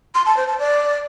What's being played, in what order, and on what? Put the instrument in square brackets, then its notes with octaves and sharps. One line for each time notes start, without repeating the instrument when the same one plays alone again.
[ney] C6
A5
C5
A5
D5